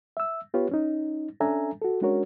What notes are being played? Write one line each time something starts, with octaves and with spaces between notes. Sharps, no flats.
E5 E6
B3 F4 G4 B4 C#5
C#4 D#4
C#4 D4 A4 E5 G#5 A#5
F#4 A4
G#3 C#4 D4 F#4 A#4 C#5